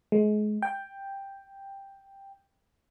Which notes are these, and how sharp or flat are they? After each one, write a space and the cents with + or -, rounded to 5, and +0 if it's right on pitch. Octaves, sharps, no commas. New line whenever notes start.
G#3 +30
G5 +5